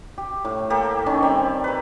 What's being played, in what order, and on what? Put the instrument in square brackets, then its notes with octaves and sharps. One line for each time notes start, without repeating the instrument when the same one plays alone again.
[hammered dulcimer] G4
A2
A#3 G4 A4
D#3 C#4
G3 C4
A#4 B4